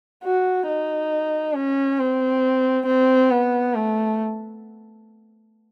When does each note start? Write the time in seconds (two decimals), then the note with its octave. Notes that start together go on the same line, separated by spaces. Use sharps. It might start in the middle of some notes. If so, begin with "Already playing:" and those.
0.24 F#4
0.68 D#4
1.55 C#4
1.99 C4
2.86 C4
3.31 B3
3.75 A3